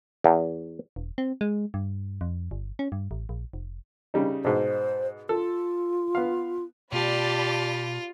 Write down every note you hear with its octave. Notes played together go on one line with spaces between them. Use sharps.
E2
E1
C4
G#3
G2
F2
G1
C#4
G2
A1
A#1
F1
C#3 G3 D#4
G#2 B2 C5
F4 A4
B3 F5
B2 A3 F4 G4 D5 A5 B5